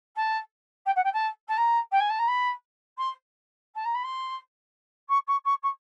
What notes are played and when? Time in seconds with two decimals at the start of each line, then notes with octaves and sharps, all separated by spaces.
0.16 A5
0.86 G5
0.96 F#5
1.04 G5
1.13 A5
1.48 A5
1.57 A#5
1.92 G5
2.00 G#5
2.09 A5
2.19 A#5
2.28 B5
2.98 C6
3.75 A5
3.85 A#5
3.94 B5
4.03 C6
5.09 C#6
5.27 C#6
5.45 C#6
5.63 C#6